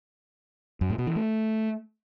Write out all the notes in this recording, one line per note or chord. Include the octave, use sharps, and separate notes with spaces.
F#2
A2
B2
E3
A3